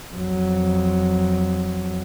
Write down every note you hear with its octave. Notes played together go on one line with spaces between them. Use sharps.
F2 F#3